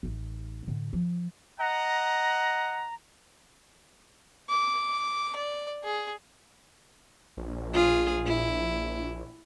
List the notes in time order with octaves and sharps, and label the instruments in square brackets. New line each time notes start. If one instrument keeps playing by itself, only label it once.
[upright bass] A1 D#4
A2 D3
F3
[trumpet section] D#5 F#5 [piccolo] A#5
[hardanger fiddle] D6
D5
G#4
[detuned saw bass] A#1
[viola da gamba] F4 G#4
E4